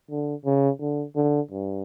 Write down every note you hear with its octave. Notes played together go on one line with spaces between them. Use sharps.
D3
C#3
D3
D3
G2